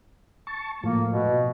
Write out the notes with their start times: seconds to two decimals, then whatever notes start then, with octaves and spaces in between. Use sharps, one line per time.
0.47 A5 C#6
0.84 A2 F3 A#3
1.10 B2